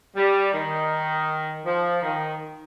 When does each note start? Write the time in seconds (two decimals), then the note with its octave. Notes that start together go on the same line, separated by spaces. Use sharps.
0.16 G3
0.53 D#3
1.65 F3
2.02 D#3